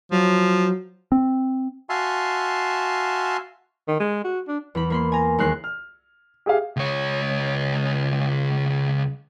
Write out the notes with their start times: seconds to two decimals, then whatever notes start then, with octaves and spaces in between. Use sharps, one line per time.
0.11 F3 F#3
1.12 C4
1.89 F#4 E5 F5 G#5 A5 C6
3.88 D#3
3.99 G#3
4.24 F#4
4.48 D4
4.75 E2 B5
4.90 A#3 B5 C6
5.12 G#5 A#5
5.38 D#2 G#3 A#4 F#6 C7
5.64 F6
6.46 G4 G#4 E5 F5
6.77 C#2 C#5